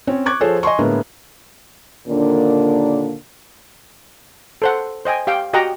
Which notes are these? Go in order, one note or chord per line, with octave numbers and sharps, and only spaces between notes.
C4 C#4 C#5
C#6 D6 F#6 G#6
F3 G#4 A4 C5 C#5
D#5 G#5 C6 C#6
A2 D3 G#3 A#3 B3
D#2 A#2 D3 A#3 D4
A4 C5 F#5
C5 D#5 G5 G#5
G4 F5 G5
F#4 G4 D#5 F#5 G5 A#5